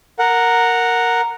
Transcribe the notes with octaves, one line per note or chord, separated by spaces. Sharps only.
A#4 F#5